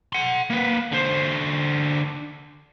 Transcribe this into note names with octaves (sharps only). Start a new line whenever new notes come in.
F#5 C6
A#3 B4
D3 C5